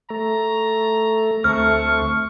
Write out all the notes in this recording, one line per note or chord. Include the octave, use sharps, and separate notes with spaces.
A3 A#5
D2 A3 C4 C#6 F6